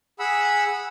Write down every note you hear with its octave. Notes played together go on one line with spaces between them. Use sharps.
G#4 F#5 B5 E6